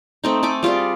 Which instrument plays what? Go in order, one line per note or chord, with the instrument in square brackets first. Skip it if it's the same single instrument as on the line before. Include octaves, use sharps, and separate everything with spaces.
[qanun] A3 C4 D#4
A3 A4 G#5 D6
G3 F4 G#4 D5